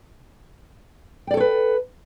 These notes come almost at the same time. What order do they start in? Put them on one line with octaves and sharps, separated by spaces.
G5 D5 A4 C#5 B4